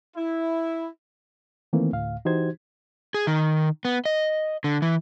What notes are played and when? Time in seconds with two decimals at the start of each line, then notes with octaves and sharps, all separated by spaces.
0.16 E4
1.73 D#3 E3 A3 A#3 C4
1.93 D2 A2 F5
2.25 E3 D#4 F#4 G4 C5 G#6
3.14 G#4
3.27 D#3
3.85 B3
4.05 D#5
4.64 D3
4.82 E3